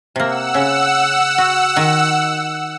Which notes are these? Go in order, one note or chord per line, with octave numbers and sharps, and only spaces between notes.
C3 A#3 F#5 E6
C#3
F#4
D#3